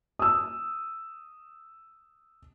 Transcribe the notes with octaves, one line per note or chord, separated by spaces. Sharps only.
D#6 E6